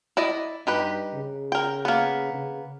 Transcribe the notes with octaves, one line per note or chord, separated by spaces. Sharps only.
E4 D5 D#5
G2 D#4 G4 B4
C#3
A#4 G5
A#3 B3
C#3